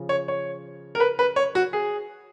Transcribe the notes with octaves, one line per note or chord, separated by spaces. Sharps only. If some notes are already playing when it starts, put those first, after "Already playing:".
Already playing: C#3 F3
C#5
C#5
A#4
B4
B4
C#5
F#4
G#4